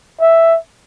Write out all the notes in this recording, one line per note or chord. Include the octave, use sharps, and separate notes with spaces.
E5